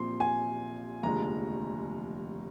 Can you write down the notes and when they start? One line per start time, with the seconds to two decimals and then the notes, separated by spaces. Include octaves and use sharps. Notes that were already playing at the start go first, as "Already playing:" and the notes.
Already playing: A#1 A#2 F3 C4 C6
0.20 G#5
1.03 F1 D#2 D3 F3 G#3 A#5